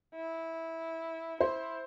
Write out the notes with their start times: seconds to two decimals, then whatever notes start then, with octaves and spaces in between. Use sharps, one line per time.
0.16 E4
1.40 E4 C5